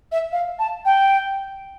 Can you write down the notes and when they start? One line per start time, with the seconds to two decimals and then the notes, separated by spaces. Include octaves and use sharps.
0.12 E5
0.32 F5
0.59 A5
0.85 G5